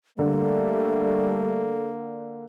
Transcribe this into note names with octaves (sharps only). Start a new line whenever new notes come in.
D3 G3 A3 A#3 A4